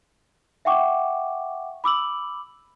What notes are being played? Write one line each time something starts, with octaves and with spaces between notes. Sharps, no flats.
E5 F#5 G5 C#6 D6
B5 D6 E6 F#7